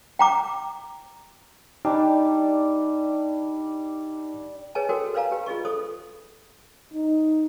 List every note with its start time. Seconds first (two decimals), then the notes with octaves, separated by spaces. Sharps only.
0.19 G5 A#5 D6
1.85 G3 D4 D#4
4.75 G#4 B4 C#5 D#5 G#5 A5
4.89 F#4 A4 A#4 C5 D5 G5
5.14 B4 C5 D5 F5 G#5 A#5
5.32 G4 B4
5.46 F4 G#4 D#5 C#6
5.65 A4 C5 D6 D#6
6.94 D#4